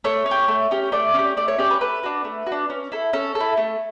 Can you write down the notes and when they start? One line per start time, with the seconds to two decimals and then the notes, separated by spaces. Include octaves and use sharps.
0.04 A3 C#5
0.26 C#4
0.31 G4
0.48 A3
0.71 C#4 G4
0.92 A3 D5
1.14 C#4 G4
1.37 A3 D5
1.48 C#5
1.58 C#4 G4 D5
1.70 B4
1.81 A3 B4
2.03 D4 F#4
2.24 A3
2.47 F#4
2.52 D4
2.70 C#4
2.92 E4 A4
3.13 C#4 A4
3.35 A4
3.40 E4
3.57 A3